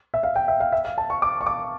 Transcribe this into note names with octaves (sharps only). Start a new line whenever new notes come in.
E5
F5
G5
E5
F5
E5
F5
A5
C#6
D6
C#6
D6